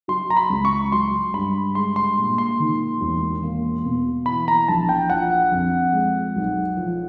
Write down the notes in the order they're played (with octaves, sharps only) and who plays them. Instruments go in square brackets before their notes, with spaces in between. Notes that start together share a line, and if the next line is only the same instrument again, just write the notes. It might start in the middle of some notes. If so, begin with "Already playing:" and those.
[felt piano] F#3 [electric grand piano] C6
[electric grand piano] A#5
B5
[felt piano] C#2
[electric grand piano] C#6
[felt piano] F#3 [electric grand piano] C6
[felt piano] G2 [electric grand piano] B5
[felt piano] G#3 [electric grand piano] C6
[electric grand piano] C6
[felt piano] A#2
[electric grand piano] C6
[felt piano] D#3
E1
A#3
B2
[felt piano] E3 [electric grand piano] B5
[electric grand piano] A#5
[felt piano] A#1 [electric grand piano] A5
[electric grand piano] G5
[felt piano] F3 [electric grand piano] F#5
[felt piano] F2
G#3
B1
F3